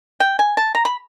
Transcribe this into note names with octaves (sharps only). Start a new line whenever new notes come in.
G5
G#5
A5
A#5
B5